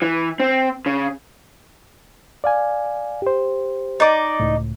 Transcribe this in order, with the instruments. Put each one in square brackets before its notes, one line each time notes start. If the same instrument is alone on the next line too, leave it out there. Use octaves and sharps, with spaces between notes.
[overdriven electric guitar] E3
C4
C#3
[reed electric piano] D5 F5 G#5
G4 C5
[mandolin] D#4 D5
[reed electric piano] C#2 A2